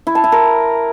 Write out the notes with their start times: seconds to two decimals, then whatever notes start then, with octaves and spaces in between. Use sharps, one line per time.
0.07 E4
0.15 A5
0.24 E4
0.32 A#4